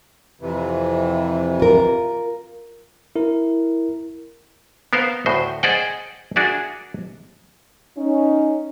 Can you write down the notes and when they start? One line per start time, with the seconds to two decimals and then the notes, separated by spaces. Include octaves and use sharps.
0.41 F2 C3 E3
1.60 F4 A#4
3.16 E4 A#4
4.93 B3 A#4 C5 F5 F#5
5.26 D2 A2 F#4 C5
5.63 G#4 C5 D5 D#5 F#5 G5
6.36 D4 F#4 G#4 A#4 D5 E5
7.97 C#4 D#4